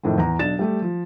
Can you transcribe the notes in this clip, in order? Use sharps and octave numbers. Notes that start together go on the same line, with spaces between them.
F2 A2 D#3 C4
E2 A#5
B1 D4 A6 E7
G3 A3 G4
F3